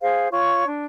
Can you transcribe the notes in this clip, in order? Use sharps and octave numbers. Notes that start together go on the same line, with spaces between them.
G#4 C5 F5
F4 C#5 C#6
D4